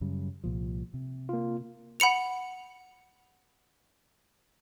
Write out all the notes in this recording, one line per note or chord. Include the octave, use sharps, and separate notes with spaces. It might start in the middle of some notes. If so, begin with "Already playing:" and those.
F#2 C#3 G3
C2 A#2 F3
C3
A#3 F4
F#5 B5 C#7 F7